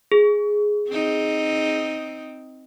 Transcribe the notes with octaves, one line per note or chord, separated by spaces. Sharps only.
G#4
C4 D#4